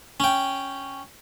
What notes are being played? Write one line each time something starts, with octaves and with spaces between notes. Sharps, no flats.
C#4 G5